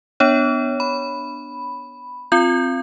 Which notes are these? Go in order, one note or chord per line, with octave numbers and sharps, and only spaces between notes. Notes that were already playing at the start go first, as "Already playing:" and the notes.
B3 D4 C#5
B5
C4 F4 G6